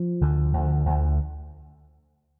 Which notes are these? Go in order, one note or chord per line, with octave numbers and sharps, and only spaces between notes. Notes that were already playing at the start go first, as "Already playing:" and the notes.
Already playing: F3
D2 D3
D2 D3
D2 D3